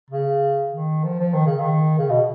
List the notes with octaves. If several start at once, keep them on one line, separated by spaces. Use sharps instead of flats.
C#3
D#3
F3
F3
D#3
C#3
D#3
C#3
B2